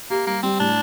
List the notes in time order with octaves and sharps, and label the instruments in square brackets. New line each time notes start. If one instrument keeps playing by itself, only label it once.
[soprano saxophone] A#3 [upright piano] G4
[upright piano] G3 [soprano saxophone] A#3
[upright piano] G3 [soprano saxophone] C4
[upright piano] A2 [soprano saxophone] D4